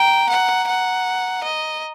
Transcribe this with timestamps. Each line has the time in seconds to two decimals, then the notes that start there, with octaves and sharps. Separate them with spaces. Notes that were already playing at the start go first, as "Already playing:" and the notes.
Already playing: G5 A#5
0.30 F#5
0.68 F#5
1.43 D#5